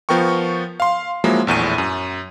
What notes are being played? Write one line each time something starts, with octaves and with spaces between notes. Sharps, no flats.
F3 B3 A#4 G5 C#6
F5 C6
F3 F#3 G#3 A#3 E4
A#1 E2 A2 D#7
F#2